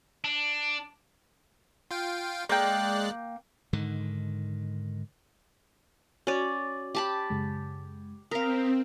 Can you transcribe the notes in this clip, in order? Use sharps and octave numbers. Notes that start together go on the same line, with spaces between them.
D4
F4 F5 G5
G#3 A#3 D5 G5 F#6
G#2 D3 D#3
C#4 F#4 D5
G4 A5 B5
F#2 C#3 G#3
C4 A#4 F5 D#6 A#6 B6